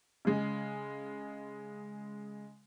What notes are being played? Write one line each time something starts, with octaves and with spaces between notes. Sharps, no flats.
C#3 G#3